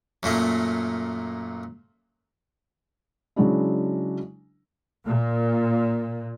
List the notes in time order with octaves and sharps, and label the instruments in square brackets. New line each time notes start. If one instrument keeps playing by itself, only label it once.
[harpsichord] F#2 A#2 A3 A#3
[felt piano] C#3 F#3 G#3 D4 E4
[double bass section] A#2